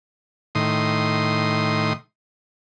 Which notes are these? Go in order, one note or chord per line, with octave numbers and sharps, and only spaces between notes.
A2 D#3 C6 D#6